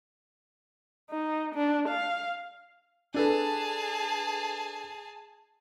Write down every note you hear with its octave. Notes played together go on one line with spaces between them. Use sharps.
D#4
D4
F5
D4 G#4 A4 B4 A5